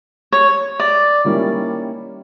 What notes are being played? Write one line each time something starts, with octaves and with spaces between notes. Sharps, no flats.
C#5
D5
D#3 G3 A#3 C#4 E4